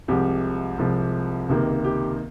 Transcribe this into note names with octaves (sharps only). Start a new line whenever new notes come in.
C2 C3 F3 G#3 G4
C2 C3 F3 G#3
C#2 C3 D#3 A#3 G4
G4